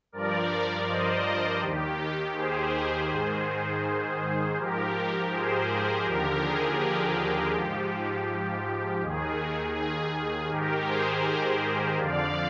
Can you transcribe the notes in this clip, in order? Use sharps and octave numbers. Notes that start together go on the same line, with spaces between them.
G2 F3 A#4 D5
C5 D#5
D#2 D#3 G4
G#4 C5
G#2 D#3
G#2 F3 G4 A#4
G#4 C5
G#4 C5
D#2 D3 F3 G4 A#4
G#4
G4
G#2 F3
D#2 D#3 G#4
G#4
G#4
G#2 D#3 G4 A#4
G#4 C5
F2 D3 F3 D5 F5